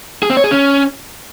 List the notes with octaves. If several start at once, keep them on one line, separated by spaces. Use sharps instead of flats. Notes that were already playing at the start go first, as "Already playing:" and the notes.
G#4
C4
C#5
G#4
C#4